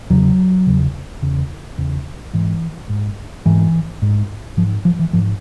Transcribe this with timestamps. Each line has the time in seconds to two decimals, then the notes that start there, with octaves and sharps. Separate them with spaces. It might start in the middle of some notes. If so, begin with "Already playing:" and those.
0.10 E2 C#3 F#3
0.67 E2 C#3
1.22 E2 C#3
1.78 E2 C#3
2.33 G#2 E3
2.89 G#2
3.46 G#2 E3
4.02 G#2
4.57 G#2 F3
4.85 F3
4.99 E3
5.13 G#2 F3